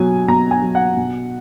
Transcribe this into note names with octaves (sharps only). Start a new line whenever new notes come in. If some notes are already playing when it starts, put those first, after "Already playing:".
Already playing: B2 F#3 G#5
B2 A#5
G#5
F#3
F#5
B2